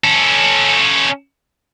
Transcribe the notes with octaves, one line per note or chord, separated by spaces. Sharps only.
C#4 A4